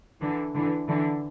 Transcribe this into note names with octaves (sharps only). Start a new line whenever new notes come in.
D3 E3
D3 E3
D3 E3